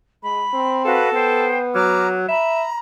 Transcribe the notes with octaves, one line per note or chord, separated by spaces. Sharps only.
G#3 B5
C4
F#4 A4 B4 F5
B3 C5 G5
F#3 A#5 D6 F6
E5 A#5 B5